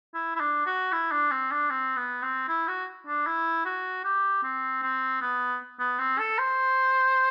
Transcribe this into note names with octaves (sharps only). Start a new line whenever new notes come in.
E4
E4
D4
F#4
E4
D4
C4
D4
C4
B3
C4
E4
F#4
D4
E4
F#4
G4
C4
C4
B3
B3
C4
A4
C5